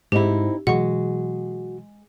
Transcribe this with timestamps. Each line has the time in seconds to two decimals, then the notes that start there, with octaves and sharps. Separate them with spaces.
0.12 G#2 C4 D#4 E4 G4
0.67 B2 E3 F#3 G#3 F#4 F#5 C#6